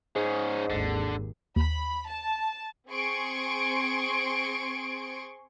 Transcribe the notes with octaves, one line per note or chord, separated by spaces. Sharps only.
G#2 C#4 D#4 G#4
G#1 D#2 D3
D#2 B5
A5
C4 G#4 C6 C#6 D7